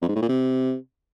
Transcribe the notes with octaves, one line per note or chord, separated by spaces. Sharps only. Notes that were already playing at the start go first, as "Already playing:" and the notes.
F2
G#2
A2
A#2
C3